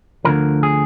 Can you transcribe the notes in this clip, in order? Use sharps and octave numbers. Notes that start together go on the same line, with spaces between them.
D2 D3 F3 A#4
G#4